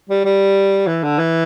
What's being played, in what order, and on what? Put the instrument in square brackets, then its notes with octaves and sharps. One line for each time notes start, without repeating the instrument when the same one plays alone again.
[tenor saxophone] G3
G3
E3
D3
E3